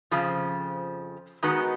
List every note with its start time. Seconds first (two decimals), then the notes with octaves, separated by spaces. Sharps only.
0.11 F2 C#3 F3
1.43 D#3 G#3 B3 D#4 F#4